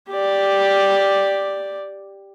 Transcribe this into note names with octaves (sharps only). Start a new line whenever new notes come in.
G4 D5